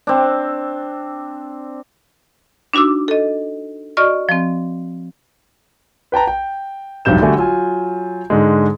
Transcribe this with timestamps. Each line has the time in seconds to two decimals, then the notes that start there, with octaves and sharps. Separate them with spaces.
0.07 C4 D4
2.74 D4 D#4 F#4 D6 E6
3.08 A4 D#5
3.97 F#4 D5 D#5 C#6 F6
4.29 F3 C4
6.12 B4 G5 A5 A#5
6.27 G5
7.05 F1 B1 G2 C3 G6 E7
7.21 D3 G3 A3 F#4 D5 G#5
7.38 F#3 F4 G#5
8.30 G#2 D3 G#3